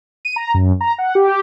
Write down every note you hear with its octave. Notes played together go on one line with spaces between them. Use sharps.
D#7
A#5
F#2
A#5
F#5
G4
G4